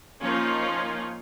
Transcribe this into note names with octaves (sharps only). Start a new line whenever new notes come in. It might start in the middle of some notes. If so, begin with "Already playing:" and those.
F3 A#3 C#4 D#4 F4